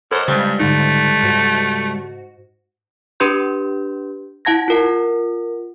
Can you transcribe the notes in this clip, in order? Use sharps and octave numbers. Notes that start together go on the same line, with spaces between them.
F#2 A4 C5 D#5
C#2 G2 C#3 G3
G#2 D3 A3 D#4
G#2 F#4
D4 G4 B4 C6 G6
E4 F#5 A5 G#6 A#6
F4 A#4 F#5